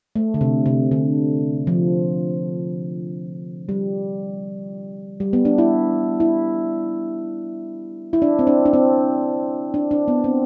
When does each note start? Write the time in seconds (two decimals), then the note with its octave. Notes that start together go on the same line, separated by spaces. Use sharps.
0.16 A3
0.34 D3
0.41 C3
0.66 C3
0.91 D3
1.67 F3
3.69 G3
5.20 G3
5.33 B3
5.45 D4
5.58 E4
6.20 E4
8.13 E4
8.22 D4
8.39 C4
8.47 D4
8.66 D4
8.73 C4
9.74 D4
9.91 D4
10.08 B3
10.24 C4